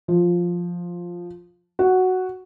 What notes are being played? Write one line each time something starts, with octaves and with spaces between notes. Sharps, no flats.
F3
F#4